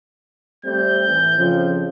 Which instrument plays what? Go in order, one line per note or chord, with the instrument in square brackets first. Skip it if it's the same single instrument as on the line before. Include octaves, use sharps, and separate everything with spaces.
[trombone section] G3 A3 C4 [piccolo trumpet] G6
[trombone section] A2 E3
F2 C#3 F3